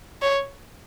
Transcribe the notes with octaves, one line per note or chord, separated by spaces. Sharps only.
C#5